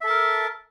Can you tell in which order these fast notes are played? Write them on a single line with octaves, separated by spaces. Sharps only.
E5 A4 A5 A#4